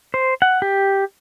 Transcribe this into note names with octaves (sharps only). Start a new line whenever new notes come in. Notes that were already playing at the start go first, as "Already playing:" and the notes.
C5
F#5
G4